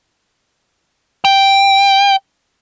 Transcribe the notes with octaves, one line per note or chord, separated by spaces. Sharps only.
G5